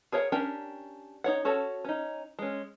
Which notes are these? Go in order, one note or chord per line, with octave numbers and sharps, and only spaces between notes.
G#4 A#4 C#5 D#5 F#5
C#4 D4 G4 A#4 G5
D#4 C#5 F#5
C#4 F#4 A4 C#5 A5
C#4 D#4
G#3 C#4